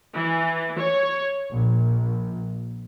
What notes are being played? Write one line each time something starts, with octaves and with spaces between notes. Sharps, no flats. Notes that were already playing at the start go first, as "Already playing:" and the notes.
E3
C#5
A#1